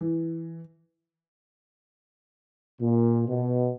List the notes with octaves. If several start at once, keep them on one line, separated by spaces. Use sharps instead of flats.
E3
A#2
B2